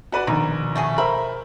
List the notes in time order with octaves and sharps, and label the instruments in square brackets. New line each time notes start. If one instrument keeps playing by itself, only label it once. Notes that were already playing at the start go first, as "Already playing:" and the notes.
[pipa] C#4 [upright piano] F#4 B4 D5
[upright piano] A#1 [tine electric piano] B2 D#3 [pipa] D#4
[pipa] A3 F#4 G#4
[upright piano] A#4 C5 E5 [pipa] B5